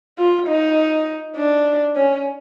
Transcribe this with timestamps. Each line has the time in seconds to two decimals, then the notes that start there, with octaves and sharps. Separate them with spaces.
0.18 F4
0.47 D#4
1.37 D4
1.96 C#4